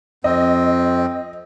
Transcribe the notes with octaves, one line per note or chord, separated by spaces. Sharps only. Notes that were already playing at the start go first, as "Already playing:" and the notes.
F2 C4 D#5